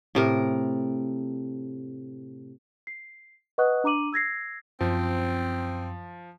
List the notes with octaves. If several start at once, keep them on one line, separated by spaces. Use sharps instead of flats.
A2 C3 A#4
C7
B4 D#5 F#5 C#6 D#6 F#6
D4 A#5 D6 D#7 F#7
E6 G#6 A#6 C7
F#2 F3 C4